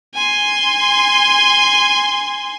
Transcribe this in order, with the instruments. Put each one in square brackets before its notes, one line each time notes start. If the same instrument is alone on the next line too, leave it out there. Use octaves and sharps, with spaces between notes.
[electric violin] G#5 C6